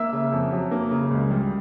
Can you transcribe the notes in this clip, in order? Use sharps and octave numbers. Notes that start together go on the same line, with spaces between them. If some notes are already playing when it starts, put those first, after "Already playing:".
Already playing: A#3 E5 E6
C#3
F2
F#3
A#3
C#3
C#2
G3